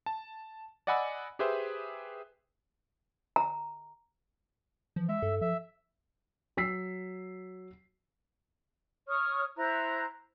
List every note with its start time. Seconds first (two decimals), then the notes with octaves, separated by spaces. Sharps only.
0.06 A5
0.87 D5 D#5 F#5 G#5 B5 E6
1.39 G4 G#4 B4 C5 E5
3.36 A#5
4.96 E3 F3
5.09 G#3 E5
5.22 G2 A4
5.41 F3 E5
6.57 F#3 E6 B6 C7
9.08 C#5 C#6 D#6 F6
9.56 E4 C5 A#5 F#6